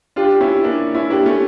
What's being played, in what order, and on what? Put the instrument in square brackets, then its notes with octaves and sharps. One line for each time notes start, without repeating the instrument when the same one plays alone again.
[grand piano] D4 F4 [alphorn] G4
[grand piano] C#4 E4
A#3 D4
C#4 E4
[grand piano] A#3 D4 [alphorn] G4
[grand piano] A3 C#4